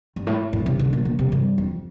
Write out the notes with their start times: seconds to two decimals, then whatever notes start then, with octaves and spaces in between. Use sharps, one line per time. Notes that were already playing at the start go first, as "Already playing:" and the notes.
0.16 G2
0.27 A2
0.53 A2
0.66 C3
0.79 D3
0.93 A#2
1.05 A#2
1.19 C3
1.32 G2
1.58 F2